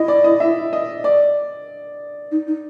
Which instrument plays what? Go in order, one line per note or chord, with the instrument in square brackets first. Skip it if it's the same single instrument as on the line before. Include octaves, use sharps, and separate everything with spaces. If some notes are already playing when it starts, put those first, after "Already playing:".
Already playing: [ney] E4 [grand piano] D#5
[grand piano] D5
D#5
E5
D#5
D5
[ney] D#4
D#4